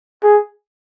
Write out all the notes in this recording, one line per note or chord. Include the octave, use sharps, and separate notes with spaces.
G#4